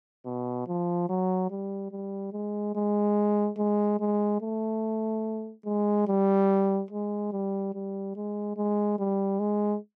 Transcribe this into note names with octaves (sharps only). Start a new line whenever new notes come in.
B2
F3
F#3
G3
G3
G#3
G#3
G#3
G#3
A3
G#3
G3
G#3
G3
G3
G#3
G#3
G3
G#3